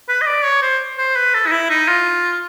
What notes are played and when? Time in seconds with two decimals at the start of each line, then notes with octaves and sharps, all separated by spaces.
0.08 B4
0.21 D#5
0.26 D5
0.44 C#5
0.62 C5
0.98 C5
1.16 B4
1.34 A4
1.47 D#4
1.52 E4
1.70 D#4
1.88 F4